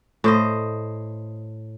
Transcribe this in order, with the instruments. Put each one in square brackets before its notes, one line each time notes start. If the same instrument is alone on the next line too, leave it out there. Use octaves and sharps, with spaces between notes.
[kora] A2 C5 D#5